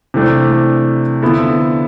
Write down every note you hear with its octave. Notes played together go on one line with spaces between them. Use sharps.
C3 E3 A3 D4
D3 F3 B3 E4 A4